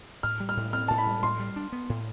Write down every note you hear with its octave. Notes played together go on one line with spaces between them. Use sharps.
A2 F6
G3
F6
A2
C4 F6
A2 A5
B5
G3
A2 C6
G3
D4
B3
A2